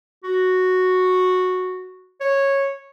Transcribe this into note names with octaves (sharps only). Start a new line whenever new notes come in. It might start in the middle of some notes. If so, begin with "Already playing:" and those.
F#4
C#5